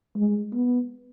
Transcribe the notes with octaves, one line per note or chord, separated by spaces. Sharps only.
G#3
B3